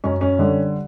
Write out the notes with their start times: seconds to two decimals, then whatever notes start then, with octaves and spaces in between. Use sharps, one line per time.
0.04 F#2 C#4
0.21 C#4
0.39 D3 G3